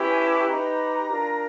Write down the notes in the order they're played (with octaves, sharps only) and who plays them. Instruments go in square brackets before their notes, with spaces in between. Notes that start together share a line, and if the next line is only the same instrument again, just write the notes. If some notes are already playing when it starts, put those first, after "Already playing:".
Already playing: [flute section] C#4 E4 G4 B4
G#5
A5
D#4 G4 B4 A#5
D4 F4 A#4